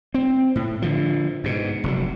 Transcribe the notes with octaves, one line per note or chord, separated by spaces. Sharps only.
C4
A2
D3 F3
G#2 B2
F1 C3 F#3